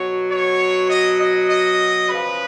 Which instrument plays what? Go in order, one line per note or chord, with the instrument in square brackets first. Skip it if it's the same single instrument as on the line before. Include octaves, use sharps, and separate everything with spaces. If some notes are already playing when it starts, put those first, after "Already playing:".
Already playing: [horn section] B2 F#3 C#5
C#5
D#5
D#5
D#5
C#3 F3 B4